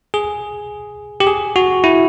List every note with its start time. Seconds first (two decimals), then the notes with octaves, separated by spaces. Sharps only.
0.14 G#4
1.20 G4
1.27 G#4
1.56 F#4
1.84 E4